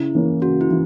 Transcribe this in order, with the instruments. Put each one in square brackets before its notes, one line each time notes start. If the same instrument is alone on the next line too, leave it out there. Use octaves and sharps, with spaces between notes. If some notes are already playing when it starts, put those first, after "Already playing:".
Already playing: [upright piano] C#3 [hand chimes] E4
[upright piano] E3 A#3 C#4
[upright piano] C#3 [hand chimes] F#4
[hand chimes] E4
[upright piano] E3